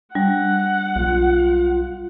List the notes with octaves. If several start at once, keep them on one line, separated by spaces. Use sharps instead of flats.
G3 D4 F#5
B1 F4